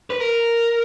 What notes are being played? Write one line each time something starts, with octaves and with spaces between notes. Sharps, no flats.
B4
A#4